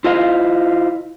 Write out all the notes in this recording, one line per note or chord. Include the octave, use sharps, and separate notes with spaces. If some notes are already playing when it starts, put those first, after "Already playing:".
E4 F4 C5 D#5 F5